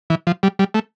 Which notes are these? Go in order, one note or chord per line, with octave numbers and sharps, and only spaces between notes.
E3
F3
G3
G3
A3